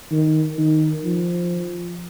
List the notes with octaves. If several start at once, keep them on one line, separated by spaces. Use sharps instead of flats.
D#3
D#3
F3